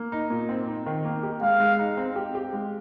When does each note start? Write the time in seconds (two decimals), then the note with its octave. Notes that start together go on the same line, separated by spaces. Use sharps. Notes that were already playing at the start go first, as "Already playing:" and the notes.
Already playing: A#3
0.12 D#4
0.30 A#2
0.49 C4
0.67 D#4
0.86 D#3
1.05 A#3
1.23 G4
1.42 G#3 F5
1.60 G#3
1.79 D#4
1.97 C4
2.16 G4
2.35 G4
2.53 G#3